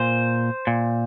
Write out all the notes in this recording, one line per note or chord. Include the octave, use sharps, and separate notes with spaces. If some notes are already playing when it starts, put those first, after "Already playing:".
Already playing: A#2 C5
A#2